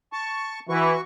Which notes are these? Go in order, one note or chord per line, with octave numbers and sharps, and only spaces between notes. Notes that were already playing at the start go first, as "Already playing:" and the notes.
A5 C#6
E3 F#4 C#6